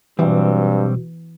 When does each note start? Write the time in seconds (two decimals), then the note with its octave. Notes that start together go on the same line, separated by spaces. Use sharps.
0.19 G2 B2 E3 F#3 G3 C4